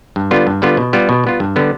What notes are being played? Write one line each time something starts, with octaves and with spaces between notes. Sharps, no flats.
G2
D3 G3 B3 F4
G2
D3 G3 B3 F4
B2
G3 B3 F4
B2
G3 B3 F4
G2
D3 G3 B3